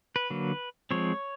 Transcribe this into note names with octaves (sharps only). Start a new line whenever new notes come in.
B4
D3 F#3 A#3
F3 G#3 C4 C#5